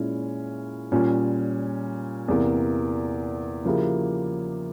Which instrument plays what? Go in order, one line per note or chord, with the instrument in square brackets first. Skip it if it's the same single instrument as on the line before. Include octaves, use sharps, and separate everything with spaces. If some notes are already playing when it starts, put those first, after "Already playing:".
Already playing: [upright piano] A#2 G#3 C#4 E4
A#2 G3 C#4
E2 C3 E3 A#3
C#3 F3 A#3 E4 G4